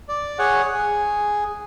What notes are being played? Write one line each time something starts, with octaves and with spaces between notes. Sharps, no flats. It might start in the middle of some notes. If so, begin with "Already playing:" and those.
D5
G#4 C#5 F#5
G#4